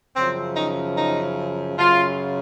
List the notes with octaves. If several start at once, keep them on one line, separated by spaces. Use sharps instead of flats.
F#2 C#3 F3 C4
D#4
D#4
F#2 C#3 F#3 F4